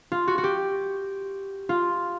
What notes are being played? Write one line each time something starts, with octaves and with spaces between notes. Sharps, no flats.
F4
F#4
F#4
G4
F4